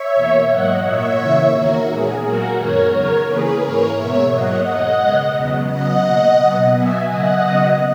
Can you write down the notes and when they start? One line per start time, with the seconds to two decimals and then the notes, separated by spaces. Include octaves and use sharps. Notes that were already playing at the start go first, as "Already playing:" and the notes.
Already playing: C#5 E5
0.15 E2 B2 A#3
0.49 G#2 F#3 A#3 D#5 F#5
0.84 A#2 A#3 C#5 E5
1.19 C#3 E3 A#3
1.53 E2 D#3 A#3 F#4 A#4
1.88 A#2 G#3 B3 G#4
2.23 A#2 F#3 A#3 F#4 A#4
2.57 F#2 D#3 G#3 B3 A#4 C#5
2.92 E2 C#3 F#3 B3 A#4 C#5
3.27 C#3 E3 A#3 G#4 B4
3.61 G#2 E3 A#3 A#4 C#5
3.96 B2 G#3 B3 C#5 E5
4.31 G#2 F#3 A#3 D#5 F#5
4.65 E2 B2 G#3 D#5 F#5
5.00 C#3 G#3 B3
5.35 E2 C#3 F#3 B3
5.69 C#3 F#3 B3 D#5 F#5
6.04 B2 A#3
6.39 B2 F#3 B3
6.73 B2 F#3 B3 E5 G#5
7.08 C#3 F#3 A#3 D#5 F#5
7.43 C#3 F#3 B3